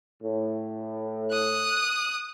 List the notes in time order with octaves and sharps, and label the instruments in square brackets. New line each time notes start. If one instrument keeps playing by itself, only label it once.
[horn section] A2
[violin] D#6 F#6